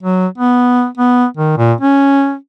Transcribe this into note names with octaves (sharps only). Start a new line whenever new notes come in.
F#3
B3
B3
D#3
A#2
C#4